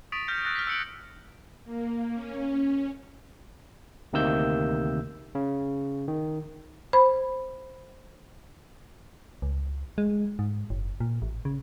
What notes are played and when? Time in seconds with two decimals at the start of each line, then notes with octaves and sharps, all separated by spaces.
0.12 C#6 D#6 A6 B6 D7 F7
0.27 F6 G6 A#6 B6 C#7
0.44 E6 F#6 A6 A#6 C7 D7
0.55 F6 B6
0.67 E6 F6 C#7 D7 F#7
1.65 A#3
2.14 C#4
4.13 D2 C3 D#3 A#3 E6 G6
5.35 C#3
6.08 D#3
6.93 C5 B5
9.42 C#2
9.98 G#3
10.39 G#2
10.70 F#1
11.00 A#2
11.22 A1
11.45 C#3